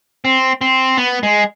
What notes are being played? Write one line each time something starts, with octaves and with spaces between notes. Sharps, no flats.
C4
C4
B3
G#3